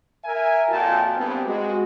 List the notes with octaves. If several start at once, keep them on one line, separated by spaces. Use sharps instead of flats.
A#4 E5 G#5
F2 A#2 F4 F#4 G5 A5
G2 B3 C4
G#3 F#4